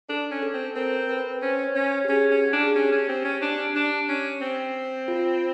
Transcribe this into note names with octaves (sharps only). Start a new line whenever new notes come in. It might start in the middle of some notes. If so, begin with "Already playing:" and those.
D4 A4
C#4
A4
C4
C4 A#4
B4
C#4 C5
C#5
C#4
C#5
G4
C#4 G#4
C#4
F#4
D4
G#4
C#4 G4
C#4
C4 G4
C#4
D4
D4
C#4
C4
F4